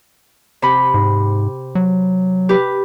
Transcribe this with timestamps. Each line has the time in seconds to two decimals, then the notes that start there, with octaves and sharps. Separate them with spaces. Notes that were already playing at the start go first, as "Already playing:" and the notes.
0.62 C3 B5
0.94 G#2
1.75 F#3
2.49 G4 B4